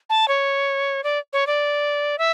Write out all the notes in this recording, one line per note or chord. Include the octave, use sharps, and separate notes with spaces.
A5
C#5
D5
C#5
D5
E5